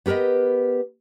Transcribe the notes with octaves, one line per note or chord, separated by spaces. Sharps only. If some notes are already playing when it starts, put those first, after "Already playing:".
B3 G4 A#4 B4 D#5